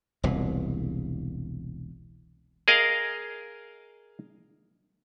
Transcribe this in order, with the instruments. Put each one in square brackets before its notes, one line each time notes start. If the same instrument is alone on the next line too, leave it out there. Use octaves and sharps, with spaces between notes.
[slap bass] E1 C2 A#2
[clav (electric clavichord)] G#4 A#4 D#5 F5